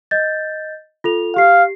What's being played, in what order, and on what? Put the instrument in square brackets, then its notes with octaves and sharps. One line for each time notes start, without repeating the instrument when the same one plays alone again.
[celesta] D#5 G6 A6
F4 A4 F7
[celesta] G4 C7 [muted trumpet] F5